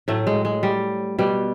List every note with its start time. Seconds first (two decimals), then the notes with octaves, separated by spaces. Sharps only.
0.08 A2 F#3 A3
0.27 G#3
0.45 G#3
0.63 G3
1.18 B2 G3